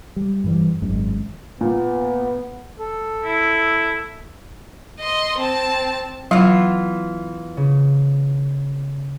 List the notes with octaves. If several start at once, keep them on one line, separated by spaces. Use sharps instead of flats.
G3
G2 E3 G3
G#1 F#2 G#3
A#2 B3
A4
E4
D#5 C6
C4 A5
E3 F#3 B3 F4 E6 C7
C#3